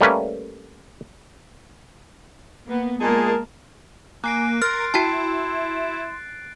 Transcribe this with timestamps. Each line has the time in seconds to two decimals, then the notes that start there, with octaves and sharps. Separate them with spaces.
0.01 G3 A3 A#3 C#4 B4
2.66 A#3 B3
3.01 A#2 G#3 A#3 D#4 G#4 A#4 A5
4.24 A#3 G#5 F#6 C7 D7
4.62 A#4 C6 F6 A6
4.94 E4 F#4 G5 A5